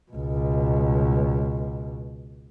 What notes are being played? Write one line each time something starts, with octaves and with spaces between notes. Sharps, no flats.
C#2 B2